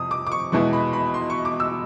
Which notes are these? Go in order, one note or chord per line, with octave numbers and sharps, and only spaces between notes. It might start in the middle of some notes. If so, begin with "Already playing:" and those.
Already playing: F2 C3 D#6
D6
D6
C#6
E2 B2 G#3 B3 E4 C#6
B5
B5
C6
C#6
D6
E6